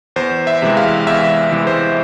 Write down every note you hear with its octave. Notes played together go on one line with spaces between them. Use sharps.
E2 C5
E5
C3 E3 G#3
F5
E2 E5
C3 E3 G#3
C5